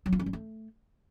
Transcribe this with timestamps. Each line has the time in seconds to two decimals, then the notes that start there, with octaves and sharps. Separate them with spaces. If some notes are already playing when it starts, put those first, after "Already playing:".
0.06 F#3
0.13 F4
0.19 C#4
0.26 G3
0.33 A3